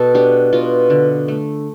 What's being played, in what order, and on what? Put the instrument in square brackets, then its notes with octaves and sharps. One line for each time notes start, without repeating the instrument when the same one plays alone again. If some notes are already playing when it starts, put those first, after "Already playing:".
Already playing: [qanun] B2 B3 A4
D4 G4
B2 F4
D3
A3